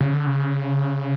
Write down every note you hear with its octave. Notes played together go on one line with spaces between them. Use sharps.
C#3
D3
C#3